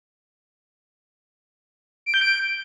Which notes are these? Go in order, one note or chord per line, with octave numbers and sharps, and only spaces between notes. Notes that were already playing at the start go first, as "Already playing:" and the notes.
D7
G6
D7